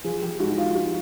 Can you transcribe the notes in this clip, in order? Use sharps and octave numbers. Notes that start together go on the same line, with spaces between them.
F3 G#4
F3 G4
G#2 F#4
F3 F4
G#2 F#4